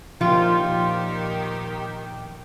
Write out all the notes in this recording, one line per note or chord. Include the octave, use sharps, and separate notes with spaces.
A#2 D#3 F3 F4 G4